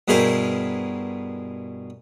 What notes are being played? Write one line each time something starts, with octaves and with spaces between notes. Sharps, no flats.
G2 B2 E4 G#4 A#4 C5